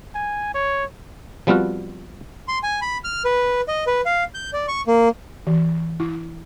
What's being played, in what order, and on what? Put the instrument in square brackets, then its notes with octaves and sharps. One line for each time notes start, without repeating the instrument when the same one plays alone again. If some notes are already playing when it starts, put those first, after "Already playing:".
[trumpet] G#5
C#5
[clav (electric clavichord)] F3 G3 B3 C4 F4 F#4
[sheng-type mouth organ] C6
G#5
B5
F6
B4
D#5
B4
F5
G6
D5
C#6
A#3
[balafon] E3
E4